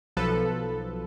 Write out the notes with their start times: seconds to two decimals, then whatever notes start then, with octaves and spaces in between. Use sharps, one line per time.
0.17 B1 F3 A4 B4